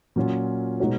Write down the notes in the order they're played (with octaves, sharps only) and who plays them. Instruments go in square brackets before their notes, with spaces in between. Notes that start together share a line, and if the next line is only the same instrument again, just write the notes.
[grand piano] A#2 F#3 C#4 F4
B2 G#3 D#4 F#4 C#5